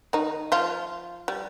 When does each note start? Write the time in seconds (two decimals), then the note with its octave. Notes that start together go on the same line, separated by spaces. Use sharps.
0.13 D#3 D#4
0.52 F3 F4
1.28 G3